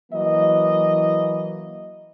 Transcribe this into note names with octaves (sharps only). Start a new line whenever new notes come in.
E3 F#3 A#3 D#5